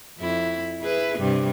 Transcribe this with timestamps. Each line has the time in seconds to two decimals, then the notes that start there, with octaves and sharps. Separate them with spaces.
0.18 F2 E4
0.82 E4 G#4 B4
1.18 G2 C3 G3